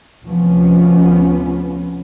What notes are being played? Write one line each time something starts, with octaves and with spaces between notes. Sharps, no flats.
D2 C3 F3 B3 C#4